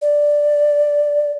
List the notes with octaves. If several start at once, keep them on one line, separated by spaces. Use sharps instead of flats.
D5